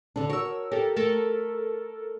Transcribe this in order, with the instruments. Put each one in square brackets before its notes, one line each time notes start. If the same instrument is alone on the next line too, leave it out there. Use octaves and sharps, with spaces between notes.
[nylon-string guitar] D3 D4
[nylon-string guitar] F#4 C#5 [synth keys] A#4 E6
[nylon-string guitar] G4 [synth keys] A4 A#4
[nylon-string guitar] A3 [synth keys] A4 A#4